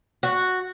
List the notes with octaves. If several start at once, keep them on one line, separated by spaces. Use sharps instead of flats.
F#4